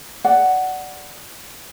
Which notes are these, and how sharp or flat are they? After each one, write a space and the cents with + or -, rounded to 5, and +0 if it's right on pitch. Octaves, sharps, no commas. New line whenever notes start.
D5 +0 F#5 +5